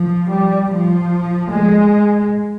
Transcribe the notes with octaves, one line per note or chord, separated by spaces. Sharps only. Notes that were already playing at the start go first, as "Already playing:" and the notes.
Already playing: F3
G3
F3
G#3